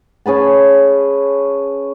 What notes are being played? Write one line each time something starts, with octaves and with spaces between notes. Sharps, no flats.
C#4 G#4 B4 A5